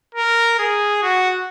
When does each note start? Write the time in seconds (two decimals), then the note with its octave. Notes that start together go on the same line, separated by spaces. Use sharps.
0.15 A#4
0.59 G#4
1.03 F#4